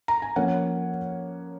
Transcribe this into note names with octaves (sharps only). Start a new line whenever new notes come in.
A#5
G#5
F3 A#3 C#4 F#5